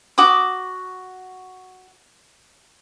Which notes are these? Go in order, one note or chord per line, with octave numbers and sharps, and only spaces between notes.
F#4 D6 D#6